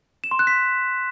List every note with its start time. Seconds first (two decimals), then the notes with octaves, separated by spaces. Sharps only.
0.24 E7
0.31 C6
0.39 F#6
0.47 B6